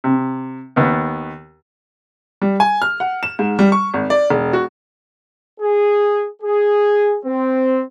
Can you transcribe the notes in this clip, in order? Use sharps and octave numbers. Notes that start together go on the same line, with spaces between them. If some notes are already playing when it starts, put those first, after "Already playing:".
C3
D#2 B3
G3
G#5
F6
F#5
E7
G#2
G3
C#6
G#1
D5
E1
F#4
G#4
G#4
C4